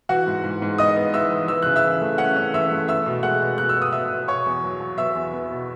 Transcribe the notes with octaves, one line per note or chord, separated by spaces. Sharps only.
E3 F#4 F#5
G#2
G#2
G#2
B3 D#5 D#6
B3
E3 E5 E6
E3
E3 E6
C#3 F#6
E5 E6
E3
A3
C#4 F#5 F#6
C#4
E3 E5 E6
A3
B3 E5 E6
B2
G#3 F#5 F#6
B2
B2 F#6
E6
B3
D#6
B2 E5 E6
B3
B2 C#5 C#6
E2
F#3
F#3
B3 E5 E6
E2
B3
B2